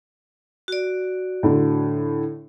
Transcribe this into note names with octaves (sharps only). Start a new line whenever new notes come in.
F#4 D5
A2 D3